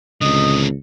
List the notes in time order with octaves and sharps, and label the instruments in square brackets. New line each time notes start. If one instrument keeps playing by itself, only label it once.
[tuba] C#2 [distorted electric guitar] D3 C4 [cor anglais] D#5